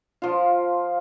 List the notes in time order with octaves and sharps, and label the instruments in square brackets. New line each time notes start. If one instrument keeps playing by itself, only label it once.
[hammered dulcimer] F3 F4